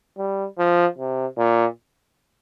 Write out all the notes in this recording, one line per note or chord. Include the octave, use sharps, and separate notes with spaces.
G3
F3
C3
A#2